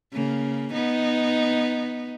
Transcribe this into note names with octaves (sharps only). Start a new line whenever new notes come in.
C#3 A#3
B3 D#4